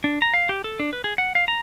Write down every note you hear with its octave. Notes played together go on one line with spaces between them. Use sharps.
D4
A#5
F5
G4
A4
D4
B4
G#4
F#5
F5
A#5